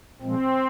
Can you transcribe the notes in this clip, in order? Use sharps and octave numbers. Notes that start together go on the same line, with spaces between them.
A#2 F3 G#3 C4